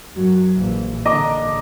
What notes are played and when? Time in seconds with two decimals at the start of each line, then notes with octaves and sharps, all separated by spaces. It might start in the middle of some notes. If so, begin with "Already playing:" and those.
0.15 F#2 F#3
0.55 A#1 E3
1.06 A#1 D3 D#5 A#5 D6